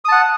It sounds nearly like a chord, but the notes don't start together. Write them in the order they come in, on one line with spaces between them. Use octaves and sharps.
D#6 A5 F#5